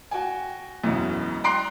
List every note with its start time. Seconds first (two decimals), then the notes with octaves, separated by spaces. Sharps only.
0.11 F#4 G5 G#5
0.83 E1 B1 F#2 B2 E3
1.44 G5 A#5 C6 F#6 C7 D7